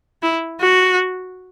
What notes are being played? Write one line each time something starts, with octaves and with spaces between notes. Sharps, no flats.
E4
F#4